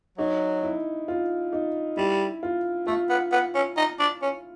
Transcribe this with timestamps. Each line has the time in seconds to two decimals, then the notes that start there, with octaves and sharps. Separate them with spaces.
0.17 F#3 D#4
0.62 E4
1.08 F4
1.53 D#4
1.97 G3 E4
2.43 F4
2.87 A3 F4
3.10 B3
3.32 B3
3.55 C#4
3.77 D#4
3.99 D4
4.22 C#4